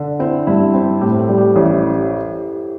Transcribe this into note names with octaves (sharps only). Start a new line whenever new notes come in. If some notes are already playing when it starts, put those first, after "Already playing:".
Already playing: D3 D4
C4 E4
G2 E4
C4 C5
A2 G4
C5
A4
G3
G4
A1 E4